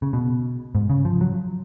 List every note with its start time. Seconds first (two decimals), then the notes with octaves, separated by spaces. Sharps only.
0.02 C#3
0.13 B2
0.75 G#2
0.90 C#3
1.05 F3
1.21 F#3